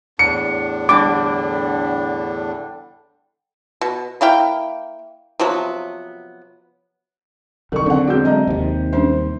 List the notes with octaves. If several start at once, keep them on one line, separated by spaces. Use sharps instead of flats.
E2 A2 D4 C#7
D3 G3 D6
B2
A#3 E4 F5 G5
C3 F3 F#3 B3
C2 D#3 F#3 A4 A#4 C#6
D3 C4 F#5
E1 C4 F#4 G#4 G6
F#3 G#3 C4 D#5 A#5
D#2 C3
G3 C#4 D4 C5